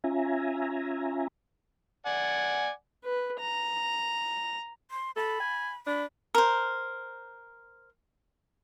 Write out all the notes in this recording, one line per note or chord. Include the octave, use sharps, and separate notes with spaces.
C#4 F4 E5 G#5 A#5
D5 F#5 G#5
B4
A#5
C6
A4 B5
G#5
D4 B5
A#4 C5